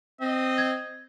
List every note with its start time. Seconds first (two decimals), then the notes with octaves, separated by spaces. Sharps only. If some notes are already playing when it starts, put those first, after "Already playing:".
0.21 C4 D#5
0.58 G#6